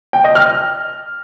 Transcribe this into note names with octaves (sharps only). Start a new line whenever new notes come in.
G5
D#5
F6